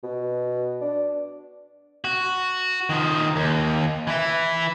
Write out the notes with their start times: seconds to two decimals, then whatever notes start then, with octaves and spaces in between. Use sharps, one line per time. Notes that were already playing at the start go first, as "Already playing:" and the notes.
0.03 B2
0.81 D4
2.05 F#4
2.90 D#3 F3
3.36 D#2
4.07 E3 E4